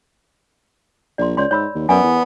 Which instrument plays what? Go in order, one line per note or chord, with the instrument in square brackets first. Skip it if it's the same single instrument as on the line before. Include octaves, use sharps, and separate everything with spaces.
[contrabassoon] A#1 [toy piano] D5 C6
[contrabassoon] C#2 [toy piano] C#5 D5 C6
[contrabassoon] G#2 [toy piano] C#5 B5 E6
[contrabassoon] D#2
[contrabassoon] F#2 [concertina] B3 [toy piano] A#4 D5 G#5
[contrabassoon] E2